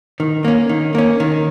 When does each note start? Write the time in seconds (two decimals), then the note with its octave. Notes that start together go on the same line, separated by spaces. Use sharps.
0.20 D#3
0.45 A#3 C#4
0.69 D#3
0.95 A#3 C#4
1.20 D#3